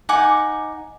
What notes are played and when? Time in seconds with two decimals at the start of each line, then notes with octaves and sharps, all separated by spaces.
0.09 D#4 F#5 G#5 D6